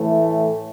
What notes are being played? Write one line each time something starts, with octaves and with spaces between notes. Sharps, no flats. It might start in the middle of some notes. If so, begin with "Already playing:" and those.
Already playing: A2 E3 A3